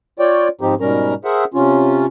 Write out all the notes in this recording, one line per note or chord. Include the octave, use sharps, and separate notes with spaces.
F4 C#5 D5 G5
G#2 F3 C4 D#4 G4
G#2 B2 G3 C#4 A#4 A#5
G#4 A#4 C5 E5 F#5
C3 C#4 F4